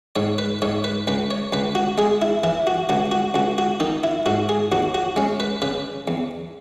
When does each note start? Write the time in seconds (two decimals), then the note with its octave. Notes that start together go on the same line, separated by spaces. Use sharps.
0.16 G#2 C#5
0.38 B4
0.62 G#2 C#5
0.84 B4
1.07 C#2 B4
1.31 C#5
1.53 C#2 B4
1.75 F#4
1.98 G#3 G#4
2.22 E4
2.43 E3 E4
2.67 F#4
2.89 C#2 F#4
3.12 F#4
3.34 C#2 F#4
3.58 F#4
3.80 D#3 D#4
4.04 E4
4.26 G#2 F#4
4.49 G#4
4.72 D#2 F#4
4.94 F#4
5.16 G#3 C#4
5.40 B4
5.62 C#3 B4
6.08 E2